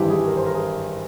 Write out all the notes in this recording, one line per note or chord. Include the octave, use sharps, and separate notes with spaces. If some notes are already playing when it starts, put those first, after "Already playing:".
Already playing: G#1 G2 E3 G4
G#4
A#4
C5
A#4
G#4